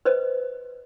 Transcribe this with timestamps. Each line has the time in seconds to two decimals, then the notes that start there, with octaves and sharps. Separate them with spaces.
0.05 B4 C5 D#5